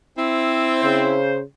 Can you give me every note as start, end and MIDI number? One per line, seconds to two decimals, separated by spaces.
0.18 1.15 60
0.18 1.15 64
0.82 1.38 49
0.82 1.38 72